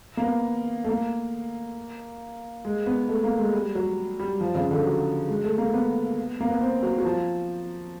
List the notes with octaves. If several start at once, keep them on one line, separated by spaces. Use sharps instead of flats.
A#3
B3
A3
A#3
G#3
B3
A3
A#3
G#3
G3
F#3
G3
F3
C#3
D3
F#3
G#3
A3
A#3
B3
A#3
B3
C4
F#3
F#3
F3